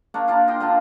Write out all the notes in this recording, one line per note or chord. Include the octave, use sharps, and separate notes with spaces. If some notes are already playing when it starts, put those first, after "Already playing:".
A#3 D4 C#5
A#3 D4 F4
A#4 D#5 G5 C6
A#2 D3 D4